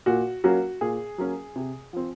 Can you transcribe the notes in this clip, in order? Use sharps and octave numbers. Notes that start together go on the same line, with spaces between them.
A#2 F#4
F#3 A#3 C#4 F#4
A#2 G#4
F#3 A#3 C#4
C3
F3 C4